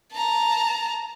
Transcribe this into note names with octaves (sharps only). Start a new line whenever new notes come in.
A5 A#5